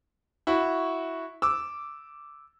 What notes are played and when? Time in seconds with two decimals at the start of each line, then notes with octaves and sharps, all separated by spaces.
0.47 E4 F#4
1.42 D6 E6